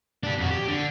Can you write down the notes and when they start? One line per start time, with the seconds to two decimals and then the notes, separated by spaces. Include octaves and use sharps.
0.24 D4 G4
0.38 F2 F#4
0.51 G4
0.68 D3